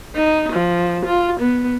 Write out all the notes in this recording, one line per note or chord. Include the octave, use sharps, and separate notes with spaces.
D#4
F3
F4
B3